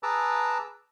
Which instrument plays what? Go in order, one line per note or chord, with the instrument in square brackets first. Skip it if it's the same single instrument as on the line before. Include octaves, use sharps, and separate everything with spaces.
[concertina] G#4 B4 A5 A#5 D6 E6